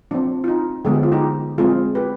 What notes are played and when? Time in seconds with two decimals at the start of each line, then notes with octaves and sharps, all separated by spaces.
0.11 F3 C4 D4
0.44 F4
0.48 D#4
0.85 D3 F3 G#3 B3 G#4
0.94 G4
1.03 F4
1.12 D#4 G4
1.58 F3 G#3 C4 F4 G#4
1.95 G4 B4